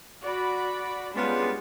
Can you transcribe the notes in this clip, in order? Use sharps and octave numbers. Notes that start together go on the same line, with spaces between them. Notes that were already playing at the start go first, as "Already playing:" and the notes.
F#4 D5 B5
G3 G#3 B3 C#4 D4 F4